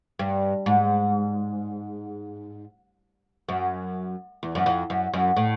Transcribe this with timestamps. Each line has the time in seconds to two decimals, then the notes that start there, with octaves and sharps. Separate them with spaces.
0.19 G2
0.66 G#2
3.49 F#2
4.43 E2
4.55 F#2
4.66 F2
4.90 F#2
5.14 F#2
5.36 A2